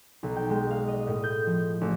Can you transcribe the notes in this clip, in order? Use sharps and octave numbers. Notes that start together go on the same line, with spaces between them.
B1
G5
G#3
F5
D#5
A2
G6
F3
A1